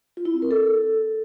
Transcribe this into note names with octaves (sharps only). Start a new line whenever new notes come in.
F4
E4
C4
A#4
A4